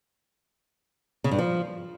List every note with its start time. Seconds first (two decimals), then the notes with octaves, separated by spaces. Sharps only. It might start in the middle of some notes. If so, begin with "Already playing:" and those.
1.24 C#3
1.31 G2
1.38 F3